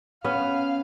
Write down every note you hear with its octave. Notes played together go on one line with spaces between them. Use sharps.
B3 C#4 F5